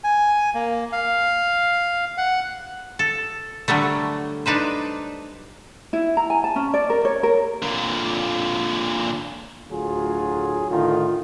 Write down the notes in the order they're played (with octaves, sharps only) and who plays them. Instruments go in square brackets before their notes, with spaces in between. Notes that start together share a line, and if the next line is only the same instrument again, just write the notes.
[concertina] G#5
A#3
F5
F#5
[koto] A4
D3 F#3 G3 A3
D4 D#4 B4 C5
[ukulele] E4
A#5
G#5
A5
C#4
D5
A#4
C#5
A#4
[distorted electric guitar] A#2 D3
[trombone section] D2 A2 F#3 F4 G#4
A2 D3 D#3 F4